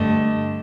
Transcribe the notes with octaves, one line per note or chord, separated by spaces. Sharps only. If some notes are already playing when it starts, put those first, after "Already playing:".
Already playing: G2 D3 A3 D#5